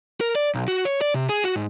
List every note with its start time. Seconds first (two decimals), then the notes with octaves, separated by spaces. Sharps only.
0.21 A#4
0.35 D5
0.55 B1
0.68 F#4
0.85 C#5
1.01 D5
1.14 C3
1.29 G#4
1.44 F#4
1.56 G#2